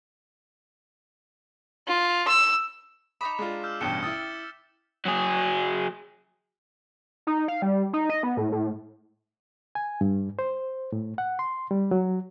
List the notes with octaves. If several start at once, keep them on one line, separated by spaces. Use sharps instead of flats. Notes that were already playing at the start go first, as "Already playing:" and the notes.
F4
E6
D#4 A#5 B5 D6 D#6 B6 E7
G#3 D4 F4
E6 F6 G6
A1 G2 B2 G5 C#7 E7 G7
E4 D#6 E6 A6
F#3 G#4
D#4
F5
G3
D#4
D#5
B3
A2
A2
G#5
G2
C5
A2
F#5
C6
G3
F#3